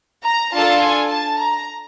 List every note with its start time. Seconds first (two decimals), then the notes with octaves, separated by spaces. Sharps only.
0.24 A#5
0.53 D4 F4 A4 A5
0.81 G#5
1.10 A5
1.40 A#5